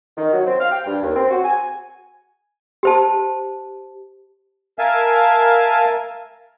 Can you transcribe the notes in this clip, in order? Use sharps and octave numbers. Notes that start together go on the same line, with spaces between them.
D#3
F#3
C4
F5
G5
G2
D#2
C4
F#4
G#5
G4 C5 A5
A#4 E5 F5 G#5 A5